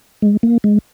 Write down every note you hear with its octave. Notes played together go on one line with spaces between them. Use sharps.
G#3
A#3
G#3